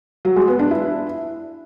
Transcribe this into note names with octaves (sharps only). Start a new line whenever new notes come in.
F#3
G#3
B3
D4
E4